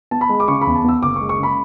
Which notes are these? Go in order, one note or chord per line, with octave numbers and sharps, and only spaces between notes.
B3 A5
B5
G#3
D6
C#3 C#6
E2 B5
A5
B3 E6
F#1 D6
C#6
G#3
C#6
C#3 B5